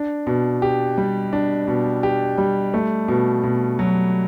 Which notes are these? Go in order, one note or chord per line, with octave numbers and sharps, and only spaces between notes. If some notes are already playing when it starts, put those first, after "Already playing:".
Already playing: D4
B2
G4
G3
D4
B2
G4
G3
A3
B2
B2
F#3